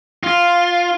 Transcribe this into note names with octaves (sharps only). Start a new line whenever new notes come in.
F4